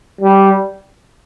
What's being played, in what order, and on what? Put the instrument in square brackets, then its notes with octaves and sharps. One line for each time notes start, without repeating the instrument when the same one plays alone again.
[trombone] G3